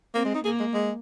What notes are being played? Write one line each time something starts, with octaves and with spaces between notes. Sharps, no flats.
A#3 C4
G#3
D#4
A#3 G#4
G#3
G#3